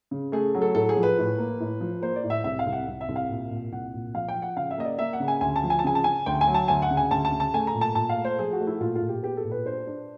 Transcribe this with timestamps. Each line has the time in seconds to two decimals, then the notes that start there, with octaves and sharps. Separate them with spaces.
0.11 C#3
0.32 A3 G#4
0.55 F#3
0.62 A4
0.75 A2 A4
0.89 G#4
0.97 F3
1.03 B4
1.18 A2
1.38 A#3
1.60 A2
1.81 F3
2.02 A#3 C5
2.16 D5
2.24 A2
2.30 E5
2.44 C2 E5
2.59 F5
2.67 C2
2.73 F#5
2.88 C2
3.01 E5
3.09 C2
3.16 F5
3.30 A#2
3.51 A#2
3.72 C2 F#5
3.94 A#2
4.14 F3 F5
4.28 G5
4.35 F3
4.42 F#5
4.56 C#3 F5
4.71 E5
4.78 A#3 D#5
4.85 D5
4.99 A#3 E5
5.13 F#5
5.20 C#3
5.28 G#5
5.41 D2 G#5
5.56 A5
5.63 F3
5.70 G#5
5.79 A5
5.84 C#3 G#5
5.95 A5
6.04 C#3 G#5
6.26 D2 G5
6.41 G#5
6.47 F#3
6.54 A5
6.68 D2 G#5
6.82 F#5
6.91 C#3
6.97 G#5
7.11 D2 A5
7.25 A5
7.32 C#3
7.40 A5
7.53 A3 G#5
7.67 A#5
7.74 A#2
7.81 A5
7.95 A#2 A5
8.09 F5
8.17 A3
8.25 C5
8.39 F3 G#4
8.53 F#4
8.60 A3
8.67 E4
8.80 A#2 F4
8.95 F4
9.02 A#2
9.09 G4
9.23 B3 G4
9.37 A4
9.44 A#2
9.51 B4
9.65 D4 C5
9.87 D4